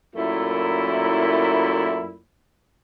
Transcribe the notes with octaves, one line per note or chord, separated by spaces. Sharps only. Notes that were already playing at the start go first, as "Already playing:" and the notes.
F#2 A#2 A3 E4